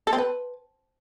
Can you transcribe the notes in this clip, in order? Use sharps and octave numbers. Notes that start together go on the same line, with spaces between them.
A4
C4
B4